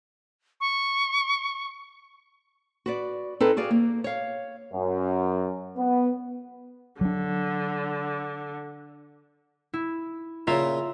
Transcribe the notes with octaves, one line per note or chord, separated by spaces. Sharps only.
C#6
F#4 B4 D5
C4 D#4 G#4 A4 B4
F#4 G#4 D5 F5
A#3
C#5 F5
F#2
B3
D3 F#3 D4
E4
A#2 C#3 F4 E5 A#5